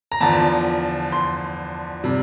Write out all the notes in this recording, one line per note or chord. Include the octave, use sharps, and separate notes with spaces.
A#5
E2 D3 F3 A5
C6
C3 G3